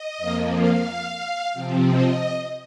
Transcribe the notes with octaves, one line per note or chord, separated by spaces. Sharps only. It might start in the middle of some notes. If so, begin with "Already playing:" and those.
Already playing: D#5
F2 F3 A#3
F5
C3 F3 C4
D#5